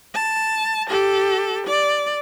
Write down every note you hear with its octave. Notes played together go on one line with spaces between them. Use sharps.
A5
G4 A4
D5